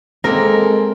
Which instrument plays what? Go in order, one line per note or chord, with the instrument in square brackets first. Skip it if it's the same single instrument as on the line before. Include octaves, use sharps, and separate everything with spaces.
[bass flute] G#3 [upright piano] A#3 C4 A4 [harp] A#4